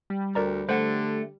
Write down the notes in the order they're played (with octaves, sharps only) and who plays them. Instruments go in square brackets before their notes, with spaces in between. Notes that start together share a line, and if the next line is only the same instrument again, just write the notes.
[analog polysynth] G3
[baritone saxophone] D2 [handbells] A#4 D5 A#5
[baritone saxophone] D3 [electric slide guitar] A3 [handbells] C5 F#5